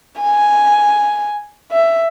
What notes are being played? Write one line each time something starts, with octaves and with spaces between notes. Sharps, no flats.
G#5
E5